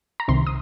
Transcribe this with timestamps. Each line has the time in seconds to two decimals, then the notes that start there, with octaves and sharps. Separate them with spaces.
0.20 A#5
0.28 C2 C3 D#3 C6
0.47 D#6